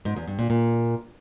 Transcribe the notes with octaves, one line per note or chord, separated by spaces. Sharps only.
G#2
E2
G2
A#2
A#2